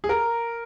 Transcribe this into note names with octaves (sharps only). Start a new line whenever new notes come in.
G#4
A#4